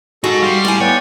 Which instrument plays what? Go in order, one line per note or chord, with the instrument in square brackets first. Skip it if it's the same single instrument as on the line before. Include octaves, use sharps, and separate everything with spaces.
[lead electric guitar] D#4 G#4 [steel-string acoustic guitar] F#4 [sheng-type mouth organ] A4
[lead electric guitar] G3 [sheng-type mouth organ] F5 C6 F6
[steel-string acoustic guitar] A2 G#5
[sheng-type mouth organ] B3 D5 G5 [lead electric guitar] C#5